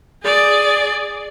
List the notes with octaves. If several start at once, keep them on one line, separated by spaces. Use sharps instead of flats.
G#4 D5